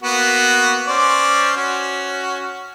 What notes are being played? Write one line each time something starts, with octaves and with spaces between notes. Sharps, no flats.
A#3 B3 F#4
C#4 C5 D5
C#4 F#4